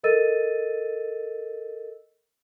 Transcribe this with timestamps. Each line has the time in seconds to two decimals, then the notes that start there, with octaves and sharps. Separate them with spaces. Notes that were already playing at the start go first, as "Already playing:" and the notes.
0.04 A4 A#4 D#5 E6 A6 D#7